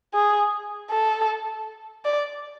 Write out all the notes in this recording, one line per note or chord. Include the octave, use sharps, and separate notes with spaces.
G#4
A4
D5